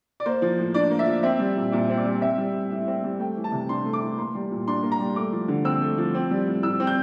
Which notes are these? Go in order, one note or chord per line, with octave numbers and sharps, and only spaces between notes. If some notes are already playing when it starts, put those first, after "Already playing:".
D5
A#3 C5
F3
A2
D4 D5
A#3
E5
F3
C4 E5
G3
A#2
A#2 D5
C4
D5
G3
C4 E5
G3
A2
A2
C4
G3
A3 G5
E3
A5
C3
D4 C6
A3
D6
E3
A#3 C6
G3
A#2
D4 C6
A#3
A#5
G3
A3 D6
F3
D3
C4 E6
A3
F3
C4
G3
A2
A2 E6
C4
G6